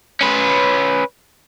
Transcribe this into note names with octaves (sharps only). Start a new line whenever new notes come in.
C#4 B4